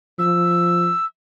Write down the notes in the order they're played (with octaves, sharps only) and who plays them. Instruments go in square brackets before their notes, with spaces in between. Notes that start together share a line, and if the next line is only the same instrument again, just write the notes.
[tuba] F3 [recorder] E6